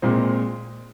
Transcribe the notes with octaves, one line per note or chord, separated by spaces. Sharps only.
A#2 G#3 C4